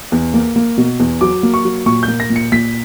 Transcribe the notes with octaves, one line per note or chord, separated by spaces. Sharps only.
E2
A#3
A#3
B2
E2
F#3 D6
A#3
C#6
F#3
A#2 C#6
G6
A#3
A#6
A#2
C#7
A#2 B6